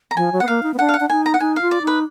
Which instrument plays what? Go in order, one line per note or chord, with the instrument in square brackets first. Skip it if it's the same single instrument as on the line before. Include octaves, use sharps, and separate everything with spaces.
[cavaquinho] A#5
[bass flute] F3 [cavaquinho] G#5
[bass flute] F#3
[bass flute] B3 [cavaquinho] F#5
[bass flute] A#3 [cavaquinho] F5
[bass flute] D#4
B3
[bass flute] D4 [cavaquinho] F#5
[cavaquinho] F5
F#5
[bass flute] D4
[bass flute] D#4 [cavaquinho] G#5
[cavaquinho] A#5
F#5
[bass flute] D#4 [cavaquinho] G#5
[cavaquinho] F5
[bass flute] F4
[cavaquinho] D5
[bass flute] D#4
[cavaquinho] B4